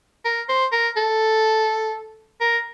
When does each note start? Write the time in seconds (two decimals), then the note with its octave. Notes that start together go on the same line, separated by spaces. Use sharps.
0.25 A#4
0.49 C5
0.72 A#4
0.96 A4
2.41 A#4